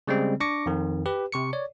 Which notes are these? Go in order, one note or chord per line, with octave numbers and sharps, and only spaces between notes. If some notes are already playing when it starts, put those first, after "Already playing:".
C#3 G3 G#3 C4
D4 C#6 D6 A#6 C#7
F2 D#3
G4 B4
C3 C#6 C#7
C#5 D5